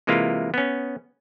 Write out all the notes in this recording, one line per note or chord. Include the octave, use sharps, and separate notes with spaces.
C3 E3 G#3 A#3 E4 F4
B3 C#4